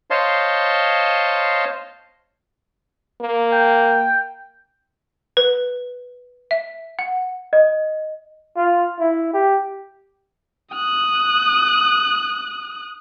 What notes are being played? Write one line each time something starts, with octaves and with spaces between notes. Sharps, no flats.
C5 C#5 D#5 F5 A5 C6
A#3
G5
B4
E5
F#5
D#5
F4
E4
G4
D#6 F#6